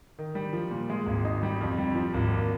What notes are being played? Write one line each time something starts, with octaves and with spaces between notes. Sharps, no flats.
D#3
G3
F3
A#2
G#3
G#1
D#4
G3
F2
G3
F3
G#1
A#3